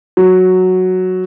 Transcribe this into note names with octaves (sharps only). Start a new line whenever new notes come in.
F#3